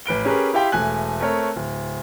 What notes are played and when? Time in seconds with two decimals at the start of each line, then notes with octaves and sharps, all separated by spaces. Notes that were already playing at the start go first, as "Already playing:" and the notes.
0.06 A1 B4 D7 G7
0.25 C#4 G4 G#4 A#4 B4
0.54 E4 G4 F5 G5 C6
0.72 E1 A3 G#5 F#6
1.20 A3 C4 A#4 C#5
1.56 D1